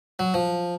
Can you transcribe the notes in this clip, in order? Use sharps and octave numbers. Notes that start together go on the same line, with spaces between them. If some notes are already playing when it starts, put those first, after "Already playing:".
F#3
F3